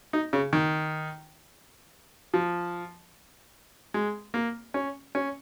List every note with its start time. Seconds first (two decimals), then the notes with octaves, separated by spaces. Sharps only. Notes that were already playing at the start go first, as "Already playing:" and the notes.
0.13 D#4
0.33 C#3
0.53 D#3
2.34 F3
3.94 G#3
4.34 A#3
4.74 C#4
5.15 C#4